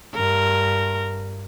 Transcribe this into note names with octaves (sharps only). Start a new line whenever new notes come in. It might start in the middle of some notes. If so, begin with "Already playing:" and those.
G2 A#4